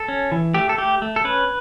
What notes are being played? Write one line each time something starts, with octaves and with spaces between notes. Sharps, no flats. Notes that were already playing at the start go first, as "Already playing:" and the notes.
Already playing: A4
C#4
E3
A3 G4
A4
A3 G4
A3
A4
C#4 B4